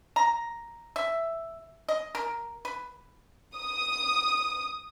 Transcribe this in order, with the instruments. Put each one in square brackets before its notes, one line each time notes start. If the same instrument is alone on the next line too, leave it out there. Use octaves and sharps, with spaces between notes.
[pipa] A#5
E5
D#5
A#4
B4
[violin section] D#6